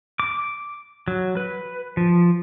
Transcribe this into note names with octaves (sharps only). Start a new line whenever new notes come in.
D6
F#3
B4
F3